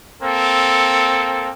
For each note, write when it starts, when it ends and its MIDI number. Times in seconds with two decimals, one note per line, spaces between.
0.22 1.49 58
0.22 1.49 60
0.22 1.49 69